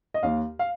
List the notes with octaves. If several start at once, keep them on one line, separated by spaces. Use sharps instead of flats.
D#5
D#2 F5
F5